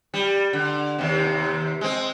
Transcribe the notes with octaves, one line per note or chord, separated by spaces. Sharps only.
G3
D3
D#2 C3
G#3 C4